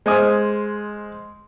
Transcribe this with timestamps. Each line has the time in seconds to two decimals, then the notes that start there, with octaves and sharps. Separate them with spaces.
0.06 G#3 C5 G#5 D#6 F6